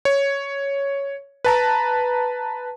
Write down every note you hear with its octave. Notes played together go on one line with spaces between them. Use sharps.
C#5
B4 A5 A#5